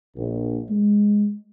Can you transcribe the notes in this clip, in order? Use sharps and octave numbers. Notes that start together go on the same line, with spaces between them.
A#1
G#3